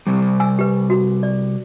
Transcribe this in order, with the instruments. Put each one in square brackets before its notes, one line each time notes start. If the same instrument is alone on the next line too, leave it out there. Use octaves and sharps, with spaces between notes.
[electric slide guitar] C3 G3
[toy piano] G#5 E6
G4 B4
F#4
D5